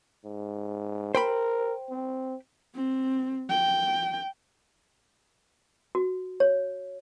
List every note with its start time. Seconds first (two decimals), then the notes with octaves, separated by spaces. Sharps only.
0.24 G#2
1.15 A#4 C5 G5 B5
1.90 C4
2.75 C4
3.50 G5
5.95 F#4
6.40 C#5